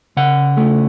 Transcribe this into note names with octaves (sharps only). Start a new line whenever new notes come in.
C#3 F#5
A3